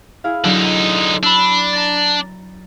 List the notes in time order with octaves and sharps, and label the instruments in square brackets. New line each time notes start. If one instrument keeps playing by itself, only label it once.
[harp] E4 G#4 F5
[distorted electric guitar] D3 D#4 [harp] F#3 D4
[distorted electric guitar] D4 [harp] B5 E6
[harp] A#5 A6